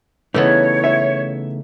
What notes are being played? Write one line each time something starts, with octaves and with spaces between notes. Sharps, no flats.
C#3 E3 A3 B3 D#4 C#5
E5